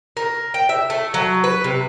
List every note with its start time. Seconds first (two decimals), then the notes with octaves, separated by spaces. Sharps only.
0.17 A#4
0.54 G5
0.69 E5
0.90 A3
1.14 F#3
1.44 B4
1.64 C3